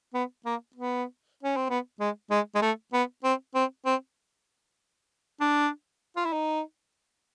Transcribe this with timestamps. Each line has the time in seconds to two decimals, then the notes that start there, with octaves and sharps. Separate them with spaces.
0.14 B3
0.46 A#3
0.76 B3
1.43 C#4
1.56 C4
1.69 B3
2.00 G#3
2.31 G#3
2.55 G#3
2.62 A3
2.93 B3
3.24 C4
3.55 C4
3.86 C4
5.40 D4
6.16 F4
6.25 E4
6.33 D#4